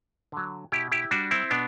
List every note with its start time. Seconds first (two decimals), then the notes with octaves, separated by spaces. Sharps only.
0.32 D3 F#3
0.72 B2 E4 G4
0.92 E4 G4
1.11 G3 D4 F#4
1.31 C4 E4
1.51 B2 B3 D4